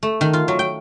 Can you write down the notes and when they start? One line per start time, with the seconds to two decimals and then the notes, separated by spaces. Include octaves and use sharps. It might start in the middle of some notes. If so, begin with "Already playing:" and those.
0.03 A3
0.21 D#3
0.33 F4
0.48 F#3
0.59 G5